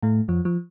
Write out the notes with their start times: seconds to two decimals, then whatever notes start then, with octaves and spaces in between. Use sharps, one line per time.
0.03 A2 A3
0.28 F2 F3
0.45 F3